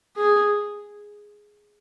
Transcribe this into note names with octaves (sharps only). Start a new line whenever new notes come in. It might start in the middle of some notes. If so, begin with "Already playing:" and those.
G#4